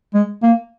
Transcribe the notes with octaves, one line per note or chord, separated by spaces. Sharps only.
G#3
A#3